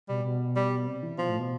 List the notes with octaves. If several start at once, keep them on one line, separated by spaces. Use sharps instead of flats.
B2 G3
B2
G3
C3
E3
B2 F3
A2
B2